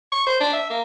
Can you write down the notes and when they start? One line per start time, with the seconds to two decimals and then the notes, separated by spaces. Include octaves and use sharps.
0.12 C#6
0.27 C5
0.41 D4
0.53 E5
0.70 A#3